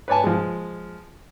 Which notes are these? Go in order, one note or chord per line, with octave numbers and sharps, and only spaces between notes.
B4 C#5 D5 G#5 A5
F3 G#3